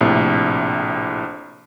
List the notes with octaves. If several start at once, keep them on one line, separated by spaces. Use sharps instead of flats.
A#1 A2 C3